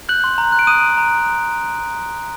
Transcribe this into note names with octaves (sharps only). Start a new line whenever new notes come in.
F#6 G6 F#7
C6
A#5
F#6
D7
D#6 F#6 D#7
A#5
A#5